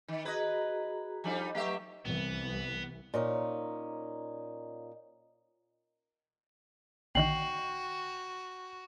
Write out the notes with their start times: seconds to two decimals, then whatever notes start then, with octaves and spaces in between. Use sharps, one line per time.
0.08 D#3
0.25 F#4 G#4 B4 D#5 A#5
1.24 F3 G3 D4 D#4 A4 G#5
1.55 F#3 A3 G4 B4 E5 C#6
2.05 C2 E3 B3
3.14 A#2 C#4 D#4
7.15 A#1 D3 D#3 F#4 G5 C7 F#7